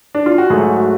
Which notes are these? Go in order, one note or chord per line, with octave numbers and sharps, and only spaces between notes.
D4
F4
F#4
G#2 F#3 A3 G#4
F#4